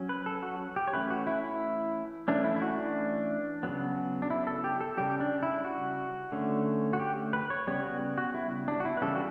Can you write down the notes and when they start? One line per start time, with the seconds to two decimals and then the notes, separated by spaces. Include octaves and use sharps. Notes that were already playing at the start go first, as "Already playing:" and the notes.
Already playing: F#3 C#4
0.09 B4
0.26 A4
0.43 F#4
0.76 G4
0.87 C#5
0.93 E3 A3 C#4 B4
1.10 F#4
1.27 E4
1.44 E4
2.28 E3 A3 C#4 D4
2.44 E4
2.56 E4
2.62 F#4
2.79 D4
3.63 C#3 F#3 B3
4.22 D4
4.30 E4
4.47 A4
4.64 G4
4.81 A4
4.97 C#3 G3 C#4 G4
5.20 D4
5.43 E4
5.65 F#4
6.32 D3 A3 C#4
6.93 F#4
7.00 G4
7.33 B4
7.50 C#5
7.67 C#3 G3 B3 C#5
7.84 F#4
8.18 F#4
8.34 E4
8.68 D4
8.80 F#4
8.85 E4
8.97 B4
9.01 C#3 E3 G3 C#4 A4
9.15 F#4